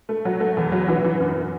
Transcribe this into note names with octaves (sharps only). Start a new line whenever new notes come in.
A3
F#3
A3
E2
F#3
E3
E3
F#2